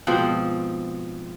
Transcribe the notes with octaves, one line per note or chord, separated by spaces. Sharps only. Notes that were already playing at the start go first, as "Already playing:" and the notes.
G#2 B2 F3 C4